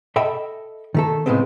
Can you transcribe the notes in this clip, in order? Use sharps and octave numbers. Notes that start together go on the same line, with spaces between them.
A4 D#5 E5 G5 B5
D#3 A3 A4
A2 C#3 F3 G#3 B3 C4